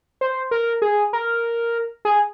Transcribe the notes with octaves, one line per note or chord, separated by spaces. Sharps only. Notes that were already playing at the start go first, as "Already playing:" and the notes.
C5
A#4
G#4
A#4
G#4